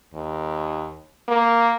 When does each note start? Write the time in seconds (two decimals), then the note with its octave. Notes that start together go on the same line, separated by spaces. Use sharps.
0.14 D#2
1.28 A#3